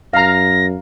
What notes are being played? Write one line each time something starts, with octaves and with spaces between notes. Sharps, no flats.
F#2 F5 A#5 A#6